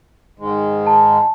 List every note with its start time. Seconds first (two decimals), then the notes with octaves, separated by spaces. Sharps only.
0.39 G#2 D#3 G#3
0.87 A5